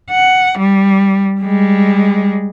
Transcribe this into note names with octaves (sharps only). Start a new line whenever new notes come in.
F#5
G3
G3 G#3